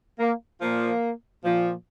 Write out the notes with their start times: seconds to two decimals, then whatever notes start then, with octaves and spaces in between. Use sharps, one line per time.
0.19 A#3
0.61 A#2 F3 A#3
1.43 A#2 F3